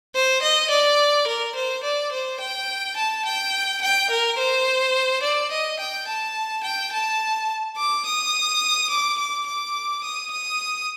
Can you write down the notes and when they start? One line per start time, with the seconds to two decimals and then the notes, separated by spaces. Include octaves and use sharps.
0.15 C5
0.42 D#5
0.70 D5
1.27 A#4
1.56 C5
1.84 D5
2.12 C5
2.40 G5
2.96 A5
3.25 G5
3.82 G5
4.10 A#4
4.38 C5
5.23 D5
5.51 D#5
5.79 G5
6.07 A5
6.64 G5
6.92 A5
7.77 D6
8.06 D#6
8.90 D6
9.19 D6
9.46 D6
10.04 D#6
10.31 D#6